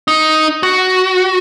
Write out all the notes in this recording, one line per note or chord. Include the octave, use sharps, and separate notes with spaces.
D#4
F#4